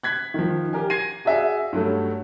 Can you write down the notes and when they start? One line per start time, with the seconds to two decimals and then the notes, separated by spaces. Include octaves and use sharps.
0.03 F#6 G#6 B6
0.34 D#3 F3
0.73 G4 A#4 G#5
0.90 G#6 A#6 C7 D#7
1.25 F#4 G#4 D5 E5 F5 G#5
1.73 G2 F#3 A3